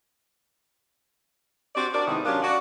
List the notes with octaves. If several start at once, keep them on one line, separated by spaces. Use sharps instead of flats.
C4 F#4 G4 D5
D4 F#4 A#4 D5
G#2 C3 D#3 B3 D#4 E4
F#3 C#4 D4 F4 G4 A#4
F#4 D5